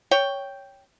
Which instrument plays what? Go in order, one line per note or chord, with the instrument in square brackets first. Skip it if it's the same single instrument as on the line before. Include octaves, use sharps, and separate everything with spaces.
[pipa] C#5 G5